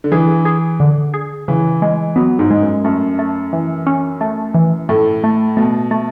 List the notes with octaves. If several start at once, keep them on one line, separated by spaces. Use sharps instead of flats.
D3
E3 G#4
G#4
D3
G#4
C#3 E3
G#3
F#3 B3
G#2
G#3
F#2
F#2 A3
A3
E3
C#4
A3
E3
A2 A3
A3
B2 A3
A3